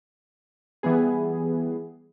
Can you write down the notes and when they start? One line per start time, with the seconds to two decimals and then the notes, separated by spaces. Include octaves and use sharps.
0.83 E3 G3 B3 G#4